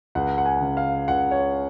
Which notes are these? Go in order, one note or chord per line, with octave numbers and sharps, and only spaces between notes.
C#2 F#5
F#5
G#5
C#3
F5
C#2 F#5
C#5